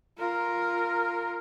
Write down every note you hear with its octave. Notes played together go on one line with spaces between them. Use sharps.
F4 A#4